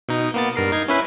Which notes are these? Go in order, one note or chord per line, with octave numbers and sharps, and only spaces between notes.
B2 D#4
A#3 B3 A6
G2 A#4 C7
D#4 G#6 C7
C#4 E4 B4